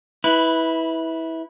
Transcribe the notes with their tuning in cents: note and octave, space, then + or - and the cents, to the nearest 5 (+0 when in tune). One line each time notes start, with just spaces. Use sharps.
E4 -20 B4 +0